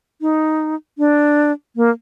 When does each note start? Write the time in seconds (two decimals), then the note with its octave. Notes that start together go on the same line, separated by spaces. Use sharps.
0.21 D#4
0.98 D4
1.76 A#3